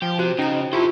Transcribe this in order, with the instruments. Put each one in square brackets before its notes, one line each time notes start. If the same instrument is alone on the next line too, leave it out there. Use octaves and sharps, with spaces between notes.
[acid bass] F3 [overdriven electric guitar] G4
[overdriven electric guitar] C3 [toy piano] F#4 C5
[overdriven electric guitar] C#3 [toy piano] C#4 A#5 [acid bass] D#4
[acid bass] E4 [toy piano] F4 G4 [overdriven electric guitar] A4 C5